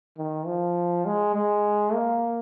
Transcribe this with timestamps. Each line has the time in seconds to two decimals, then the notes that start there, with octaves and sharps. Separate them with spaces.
0.18 D#3
0.46 F3
1.05 G#3
1.35 G#3
1.94 A#3